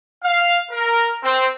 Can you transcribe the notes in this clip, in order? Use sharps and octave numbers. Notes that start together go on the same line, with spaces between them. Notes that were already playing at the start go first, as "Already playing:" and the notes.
F5
A#4
C4